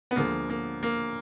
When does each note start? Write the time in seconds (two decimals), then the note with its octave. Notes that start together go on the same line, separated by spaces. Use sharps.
0.11 B3
0.16 D2 D3 F3 G#3 A#3
0.50 A#3
0.83 A#3